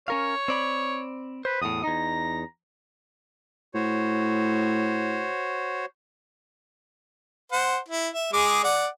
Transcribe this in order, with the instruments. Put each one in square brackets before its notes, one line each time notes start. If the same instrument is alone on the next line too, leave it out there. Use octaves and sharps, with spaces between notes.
[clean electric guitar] C#4 A#4 F5 [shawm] C#5
[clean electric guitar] C4 D5 B5
[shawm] B4 [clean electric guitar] C5
[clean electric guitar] E2 A2 [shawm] D#6
[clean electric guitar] E2 D#4 [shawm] A#5
[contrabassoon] A2 [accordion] F#4 C5 C#5
[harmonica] C5 F#5
E4
E5
G#3 G#4 D6
D5 F#5